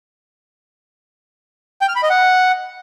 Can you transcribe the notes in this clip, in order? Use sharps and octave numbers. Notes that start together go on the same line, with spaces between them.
G5
F6
B5
D#5
F#5